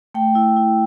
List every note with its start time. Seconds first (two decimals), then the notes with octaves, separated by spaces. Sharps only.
0.14 A3 G5
0.35 E4
0.57 E4